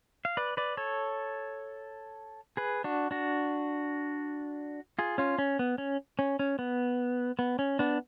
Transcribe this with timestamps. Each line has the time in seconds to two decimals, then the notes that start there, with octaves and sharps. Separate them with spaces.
0.25 F5
0.37 B4 D5
0.57 B4 D5
0.77 A4 C#5
2.57 G#4 B4
2.84 D4 F#4
3.11 D4 F#4
4.99 F4 G#4
5.18 C#4 F4
5.38 C#4
5.59 B3
5.78 C#4
6.19 C#4
6.39 C#4
6.59 B3
7.39 B3
7.59 C#4
7.79 B3 D4